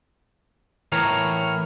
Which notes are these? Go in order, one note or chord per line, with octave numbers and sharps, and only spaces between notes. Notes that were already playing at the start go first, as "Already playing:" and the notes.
A2 E3 A#4 C#5